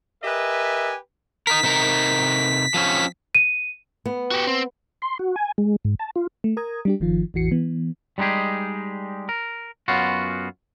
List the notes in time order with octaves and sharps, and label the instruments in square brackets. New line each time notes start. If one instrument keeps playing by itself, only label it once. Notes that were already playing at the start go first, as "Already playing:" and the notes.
[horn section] G4 A#4 B4 D#5 E5 G#5
[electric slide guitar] D#4 A#4 [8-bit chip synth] B6
[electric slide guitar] C3 D#4 A#4
F3 C4 C#4
[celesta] D#7
[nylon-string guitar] B3
[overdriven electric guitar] F#4 G4
C4
[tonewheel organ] C6
F#4
G#5
G#3
G#2
A5
F4
[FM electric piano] A3
A#4 A#5 D#6 G#6
G3 D4 G4
G1 D#3 F3 F4
A1 E2 E3 F#4 C7 C#7
E3 B3
[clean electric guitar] G3 G#3 D#4 G4 G#4
A#4
F#2 B3 C#4 F4 F#4